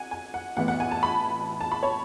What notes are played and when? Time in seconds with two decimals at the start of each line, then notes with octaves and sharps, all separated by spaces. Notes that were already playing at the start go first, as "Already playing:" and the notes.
Already playing: F#5 G#5
0.11 G#5
0.34 F#5
0.57 A1 A2 E3 B3 F#5
0.68 F#5
0.80 G#5
0.91 A5
1.03 B5
1.61 A5
1.72 B5
1.83 C#5